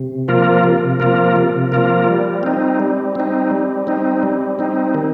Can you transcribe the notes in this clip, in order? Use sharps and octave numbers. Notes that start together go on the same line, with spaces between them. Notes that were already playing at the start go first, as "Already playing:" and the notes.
Already playing: C3
F3 A#3 F4 A#4
C3
F3 A#3 F4 A#4
C3
F3 A#3 F4 A#4
G3
C4 D#4
G3
C4 D#4
G3
C4 D#4
G3
C4 D#4
D#3